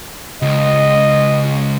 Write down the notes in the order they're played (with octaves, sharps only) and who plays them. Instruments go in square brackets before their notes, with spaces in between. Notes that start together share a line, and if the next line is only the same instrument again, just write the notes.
[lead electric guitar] C#2 [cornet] D#5